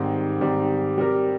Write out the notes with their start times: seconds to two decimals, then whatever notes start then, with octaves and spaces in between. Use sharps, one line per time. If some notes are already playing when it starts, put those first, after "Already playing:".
Already playing: G#2 D#3 G3 C4
0.41 G#2 D#3 G3 C4
0.98 G3 C4 G4 A#4